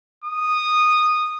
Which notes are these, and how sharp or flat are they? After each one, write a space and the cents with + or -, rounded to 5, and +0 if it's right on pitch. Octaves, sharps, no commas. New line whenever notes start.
D#6 -10